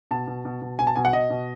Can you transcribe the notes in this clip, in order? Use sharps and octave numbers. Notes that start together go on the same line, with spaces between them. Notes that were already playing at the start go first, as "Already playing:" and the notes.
B2 A5
B2
B2
B2
B2 G#5
A5
B2 G#5
F#5
B2 D#5
B2